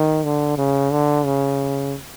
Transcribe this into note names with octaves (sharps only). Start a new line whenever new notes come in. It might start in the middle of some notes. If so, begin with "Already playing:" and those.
Already playing: D#3
D3
C#3
D3
C#3